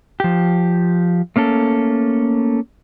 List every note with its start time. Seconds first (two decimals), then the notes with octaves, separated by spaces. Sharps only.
0.20 F3 G4
1.36 A3 A#3 C#4 A4